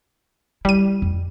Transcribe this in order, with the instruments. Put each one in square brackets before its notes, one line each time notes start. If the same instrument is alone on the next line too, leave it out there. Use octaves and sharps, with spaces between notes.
[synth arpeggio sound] G3 D#7 [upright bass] E4
[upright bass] F2